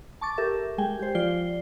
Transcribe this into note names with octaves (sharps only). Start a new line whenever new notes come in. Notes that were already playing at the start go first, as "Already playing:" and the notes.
A5 C#6 D6 A6
G4 A4 A#4 E5
G#3 G#4 G5 G#5
G4 C5
F3 F4 D5 C7 G7